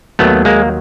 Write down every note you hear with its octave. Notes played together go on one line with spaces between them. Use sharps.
D#2 D#3 F#3 A3 B3
G#3 A#3